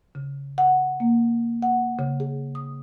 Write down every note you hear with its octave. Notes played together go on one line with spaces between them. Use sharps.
C#3
F#5
A#3
F#5
C#3
G#4
D#6